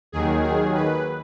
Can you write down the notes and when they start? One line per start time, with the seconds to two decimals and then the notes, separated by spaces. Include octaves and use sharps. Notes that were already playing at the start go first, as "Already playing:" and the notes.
0.12 D#2 D#3 F#3 G#4
0.43 G#4
0.75 B4